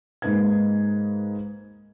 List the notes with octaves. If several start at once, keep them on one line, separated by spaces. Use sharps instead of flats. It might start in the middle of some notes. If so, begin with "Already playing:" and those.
G#2 G#3 A#3 D#4 B4 G#6